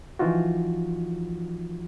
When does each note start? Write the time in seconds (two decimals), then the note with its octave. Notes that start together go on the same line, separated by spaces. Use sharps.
0.19 E3 F3 D#4 F4 F#4